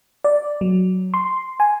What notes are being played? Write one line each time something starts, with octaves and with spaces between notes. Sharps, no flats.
D5
F#3
C6
G#5